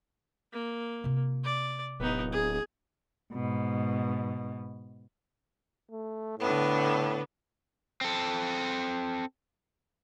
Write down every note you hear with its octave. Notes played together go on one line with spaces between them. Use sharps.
A#3
C3 F4
D5
D1 B3 D#4
D4 G#4
G#2 B2
A3
A2 D3 B3
C4 A4